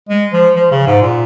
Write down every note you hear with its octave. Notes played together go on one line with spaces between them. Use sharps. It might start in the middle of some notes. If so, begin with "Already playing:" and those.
G#3
F3
F3
C#3
G#2
A#2